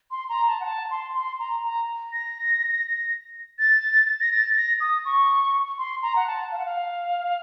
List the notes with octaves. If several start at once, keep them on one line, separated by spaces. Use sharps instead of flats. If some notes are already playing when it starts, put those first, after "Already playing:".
C6
A#5
A5
F#5
A5
C6
C6
A#5
A#5
A#6
A6
A#6
A6
A#6
D#6
C#6
C6
A#5
F#5
A5
F5
F#5
F5